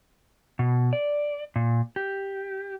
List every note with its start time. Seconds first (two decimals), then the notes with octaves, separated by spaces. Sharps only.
0.59 B2
0.93 D5
1.56 A#2
1.96 G4